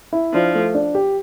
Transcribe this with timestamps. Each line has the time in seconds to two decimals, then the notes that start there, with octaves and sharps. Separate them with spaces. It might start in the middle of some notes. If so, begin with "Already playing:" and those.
0.13 E4
0.33 F3 D4
0.55 A3
0.74 D4
0.95 G4